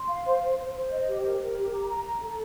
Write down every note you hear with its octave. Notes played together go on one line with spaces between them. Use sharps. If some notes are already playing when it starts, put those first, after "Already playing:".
Already playing: C6
F5
C5
C5
C5
C5
D#5
G4
A#4
A#4
G4
A#5
A#5
A#5
A4